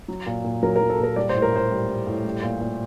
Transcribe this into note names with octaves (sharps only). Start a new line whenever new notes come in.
F#3
A#2
A#2
F#3 A#4
A#4
F#3
A4
A#2
A#4
G3 D5
C5
A2
A#4
A2 C5
G3
G3
A2
G3
A#2
A#2